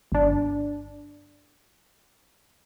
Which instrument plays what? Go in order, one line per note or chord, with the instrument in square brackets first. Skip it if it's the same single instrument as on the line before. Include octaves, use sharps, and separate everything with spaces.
[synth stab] G1 D4